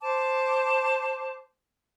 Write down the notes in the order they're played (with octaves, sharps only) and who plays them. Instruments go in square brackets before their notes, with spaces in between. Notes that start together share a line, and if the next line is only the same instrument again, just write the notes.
[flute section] C5 A5 D6